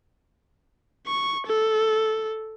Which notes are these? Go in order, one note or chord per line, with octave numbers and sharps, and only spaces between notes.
C#6
A4